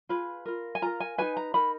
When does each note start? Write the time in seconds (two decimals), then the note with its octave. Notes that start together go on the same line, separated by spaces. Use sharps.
0.09 F4 G#4 B4 B5
0.46 F4 A#4
0.75 G#5
0.82 F4 A#4 A#5
1.00 G#5
1.18 D#4 F#4 B4 G#5
1.37 A#5
1.54 D#4 A#4 B5